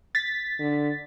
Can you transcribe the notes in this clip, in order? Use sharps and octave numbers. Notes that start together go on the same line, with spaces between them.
A6 B6
D3